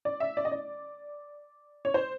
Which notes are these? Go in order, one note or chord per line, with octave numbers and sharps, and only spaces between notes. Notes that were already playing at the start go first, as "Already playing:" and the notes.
D5
E5
D5
D#5
D5
C#5
C5